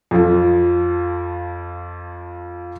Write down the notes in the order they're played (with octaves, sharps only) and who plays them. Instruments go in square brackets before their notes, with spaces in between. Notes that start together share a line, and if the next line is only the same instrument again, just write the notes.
[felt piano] F2 F3